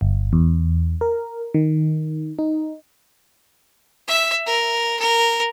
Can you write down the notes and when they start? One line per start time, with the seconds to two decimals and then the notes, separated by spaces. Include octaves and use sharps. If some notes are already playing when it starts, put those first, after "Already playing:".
0.01 G1
0.33 E2
1.01 A#4
1.54 D#3
2.39 D#4
4.08 E5
4.46 A#4
4.99 A#4